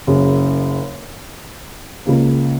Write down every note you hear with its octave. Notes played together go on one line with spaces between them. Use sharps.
F#1 F#2 C#3
C#2 C#3 A#3